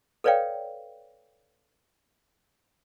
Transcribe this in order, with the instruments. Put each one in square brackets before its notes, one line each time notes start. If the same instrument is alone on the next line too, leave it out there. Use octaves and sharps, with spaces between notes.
[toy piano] A4 B4 C#5 D5 F5 G5